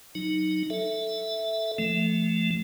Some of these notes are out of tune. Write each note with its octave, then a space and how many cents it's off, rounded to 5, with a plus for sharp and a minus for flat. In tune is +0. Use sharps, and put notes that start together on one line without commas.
F#3 -5 D#4 +0
A4 +0 E5 +0
F3 -30 A3 +0